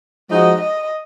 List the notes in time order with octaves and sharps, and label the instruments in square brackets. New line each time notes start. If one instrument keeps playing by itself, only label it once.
[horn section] F3 G#3 D#4 F#4 [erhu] D#5
[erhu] D#5